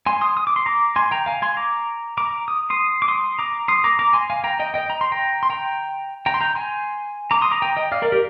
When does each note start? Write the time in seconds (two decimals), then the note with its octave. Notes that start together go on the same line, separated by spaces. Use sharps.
0.06 G#5 C6
0.21 C6 D#6
0.37 D#6
0.47 D6
0.56 C6
0.66 A#5 D6
0.96 G#5 C6
1.11 G5 A#5
1.26 F5 G#5
1.42 G#5 C6
1.57 A#5 D6
2.17 A#5 D6
2.48 D#6
2.70 C6 D#6
3.02 D6
3.08 C6 D#6
3.39 A#5 D6
3.68 C6 D#6
3.84 A#5 D6
3.99 A#5 D6
4.13 G#5 C6
4.30 F5 G#5
4.44 G5 A#5
4.60 D#5 G5
4.74 D#5 G5
4.90 A#5
5.01 C6
5.12 G5 A#5
5.43 C6
5.50 G5 A#5
6.26 G5 A#5
6.34 C6
6.41 G5 A#5
6.55 G#5 C6
7.31 A#5 D6
7.41 C6 D#6
7.51 A#5 D6
7.62 G5 A#5
7.77 D#5 G5
7.92 D5 F5
8.02 A#4 D5
8.12 G4 A#4